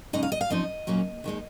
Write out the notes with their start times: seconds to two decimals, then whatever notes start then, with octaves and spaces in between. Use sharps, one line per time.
0.13 C#3 G#3 D#4 D#5
0.23 F5
0.32 D#5
0.41 F5
0.50 F#2 F3 C4 D#4 D#5
0.87 A#2 F#3 A#3 C#4
1.24 D#2 D#3 G#3 D#4